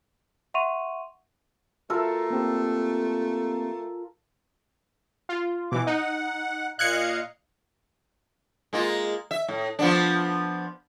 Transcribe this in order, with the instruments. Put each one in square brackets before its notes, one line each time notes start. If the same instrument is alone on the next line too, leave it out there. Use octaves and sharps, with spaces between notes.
[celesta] E5 F#5 C6 C#6 D#7 F7
[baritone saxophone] A3 [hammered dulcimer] F4 A4 A#4 [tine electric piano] F#4
[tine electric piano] A#3 C4 G4
[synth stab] F4
[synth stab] B2 E3 [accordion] D6
[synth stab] D#4 [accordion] F#5
[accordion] A#2 D#5 F5 [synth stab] F#6 G#6 C#7
[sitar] G#3 A#3 F4
E5
A2
F3 B3 D4